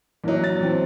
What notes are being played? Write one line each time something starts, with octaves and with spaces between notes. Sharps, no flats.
A#1 E3 F#3 A#3 D#4
A6
E3 C4